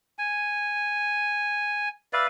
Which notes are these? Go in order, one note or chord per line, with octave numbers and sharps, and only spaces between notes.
G#5
B4 D5 E5 F5